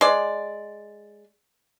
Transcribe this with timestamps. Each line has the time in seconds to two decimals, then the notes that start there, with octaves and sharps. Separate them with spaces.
0.01 G#3 D5